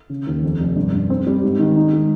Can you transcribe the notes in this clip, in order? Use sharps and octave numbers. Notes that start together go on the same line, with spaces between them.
C#3
D#2
F2
F1
G2
G2
C4
G3
G#2
D#3
D#4
G#3